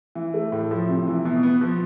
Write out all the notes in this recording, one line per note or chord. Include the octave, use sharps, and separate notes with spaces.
E3
A3
A2
F3
C3
E3
B2
B3
F3